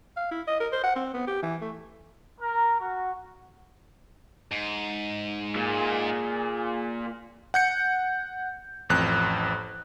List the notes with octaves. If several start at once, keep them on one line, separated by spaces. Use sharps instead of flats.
F5
E4
D#5
A#4
C5
F#5
C4
B3
G4
E3
A3
A#4
F#4
G#2
A#2 G#4
F#5 G6 C#7
A1 F2 F#6